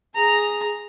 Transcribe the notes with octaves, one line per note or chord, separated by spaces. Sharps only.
G#4 A#5